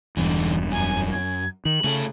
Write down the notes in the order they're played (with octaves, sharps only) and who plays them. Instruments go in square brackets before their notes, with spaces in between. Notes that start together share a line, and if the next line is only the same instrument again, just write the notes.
[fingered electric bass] E1 E2 G2 [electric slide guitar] D3 E3
[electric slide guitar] F#2 [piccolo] G#5
[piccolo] G#6
[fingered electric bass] D#3 [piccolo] F#7
[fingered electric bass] C#3 [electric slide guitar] A3 F4 A4